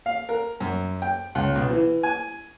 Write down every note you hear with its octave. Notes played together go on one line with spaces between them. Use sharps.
F5
A#4
F#2
G5
C#2
B1
E3
G#5